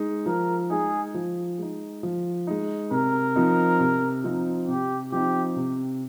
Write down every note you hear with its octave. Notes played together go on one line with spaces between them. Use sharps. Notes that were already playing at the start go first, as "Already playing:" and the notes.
Already playing: G#3 D#4
F3 A#4
G#3 D#4 G#4
F3
G#3 D#4
F3
G#3 D#4
C3 A#4
F3 C4 D#4
C3
F3 C4 D#4
C3 G4
F3 C4 D#4 G4
C3